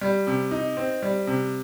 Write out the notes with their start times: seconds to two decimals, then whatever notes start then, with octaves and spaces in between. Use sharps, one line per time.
0.01 G3
0.27 C3
0.51 D#4
0.77 C4
1.02 G3
1.27 C3